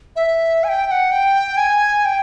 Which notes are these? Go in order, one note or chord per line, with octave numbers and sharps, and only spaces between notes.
E5
G#5
G5
G5
F#5
G5
G#5
G5